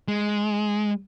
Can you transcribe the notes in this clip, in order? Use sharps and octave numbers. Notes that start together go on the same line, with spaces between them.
G#3